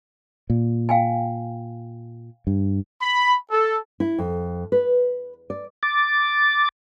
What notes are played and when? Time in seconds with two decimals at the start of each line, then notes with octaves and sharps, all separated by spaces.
0.50 A#2
0.89 F5 G5 G#5
2.47 G2
3.01 B5
3.51 A4
4.00 E4
4.18 F2
4.72 B4
5.50 D5
5.83 D6 A6